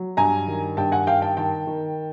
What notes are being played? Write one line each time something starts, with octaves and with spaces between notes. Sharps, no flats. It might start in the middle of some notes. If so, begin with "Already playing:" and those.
Already playing: F#3
G2 G#5 A#5
D#3
G2 G5 A5
F#5 G#5
D#3 F5 G5
G5 A5
D#3 G5 A5
D#3